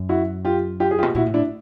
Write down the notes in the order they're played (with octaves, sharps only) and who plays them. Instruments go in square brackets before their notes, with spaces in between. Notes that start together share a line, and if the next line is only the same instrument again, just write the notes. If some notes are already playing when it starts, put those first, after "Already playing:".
Already playing: [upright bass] F#2
[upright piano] E4 F#4
F4 G4
F4 G4
G#4
F4 G4
[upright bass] B2
[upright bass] A#2 [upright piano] E4 F#4
[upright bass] A2
[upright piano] D4 E4